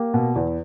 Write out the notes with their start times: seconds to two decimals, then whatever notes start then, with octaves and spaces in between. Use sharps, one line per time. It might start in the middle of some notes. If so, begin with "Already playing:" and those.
Already playing: A#3 G4
0.14 B2
0.36 E2